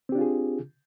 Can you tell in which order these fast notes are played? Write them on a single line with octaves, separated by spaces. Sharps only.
C4 G4 D4 F4 G#4